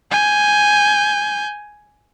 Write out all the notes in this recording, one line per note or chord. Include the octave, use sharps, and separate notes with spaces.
G#5 G6